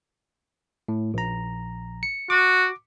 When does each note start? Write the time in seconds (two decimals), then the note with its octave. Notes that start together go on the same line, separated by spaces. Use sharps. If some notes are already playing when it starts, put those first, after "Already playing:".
0.88 A2
1.14 A#1 A#5
2.03 C#7
2.30 F#4 D6